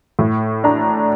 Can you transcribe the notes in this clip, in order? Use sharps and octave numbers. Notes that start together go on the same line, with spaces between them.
A2
D4 A#5